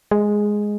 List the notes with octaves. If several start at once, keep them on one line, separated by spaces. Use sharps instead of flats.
G#3